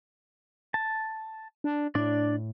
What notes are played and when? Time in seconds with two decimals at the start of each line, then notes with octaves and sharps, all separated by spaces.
0.74 A5
1.64 D4
1.95 A2 D4 D5